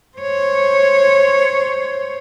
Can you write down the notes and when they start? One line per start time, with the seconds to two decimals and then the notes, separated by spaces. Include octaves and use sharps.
0.18 C5 C#5